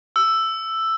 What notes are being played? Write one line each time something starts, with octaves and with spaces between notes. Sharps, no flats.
E6